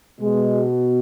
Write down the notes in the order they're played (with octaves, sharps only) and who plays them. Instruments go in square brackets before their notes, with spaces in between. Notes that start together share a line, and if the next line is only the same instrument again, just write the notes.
[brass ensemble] B2 G#3